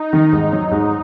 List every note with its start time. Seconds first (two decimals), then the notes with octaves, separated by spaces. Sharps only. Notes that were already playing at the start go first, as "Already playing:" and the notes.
Already playing: D#4
0.13 D#3
0.32 G#2
0.52 F#3
0.71 G#2